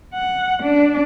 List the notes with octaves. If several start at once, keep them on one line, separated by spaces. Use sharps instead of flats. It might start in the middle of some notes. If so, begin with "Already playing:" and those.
F#5
D4